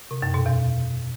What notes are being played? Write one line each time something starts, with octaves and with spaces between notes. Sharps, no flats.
C3
F#2
B2
E2